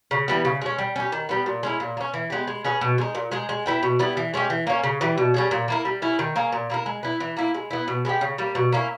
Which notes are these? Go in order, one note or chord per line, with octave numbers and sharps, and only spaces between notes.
C#3
E3 G3 B3
C#3
G#3 C#4
G3
C#4 G4
D#3
G3 B3
A#2
G#3 C#4 E4
A#2
A#3
C#4
E3
G#3 B3 G4
G#3
C#4 G#4 B4
B2
G#3 D#4
A#2
G#3 D#4 G#4
G#3
B3 E4 G4
B2
G3 B3 E4
E3
G#3 C#4 G4
E3
A#3 C#4
C#3
E3 G3
B2
G3 C#4 G#4
A#2
A#3 E4 A#4
G3
C#4 E4
D#3
A#3 C#4 G#4
A#2
A#3 E4 A#4
G#3
B3 E4
E3
A#3 E4
G#3
B3 E4
B2
G#3 B3 G4
C#3
G3 A#3
B2
A#3 C#4 E4